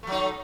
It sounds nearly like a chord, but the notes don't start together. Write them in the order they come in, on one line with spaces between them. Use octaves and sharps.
A3 F#3 D#4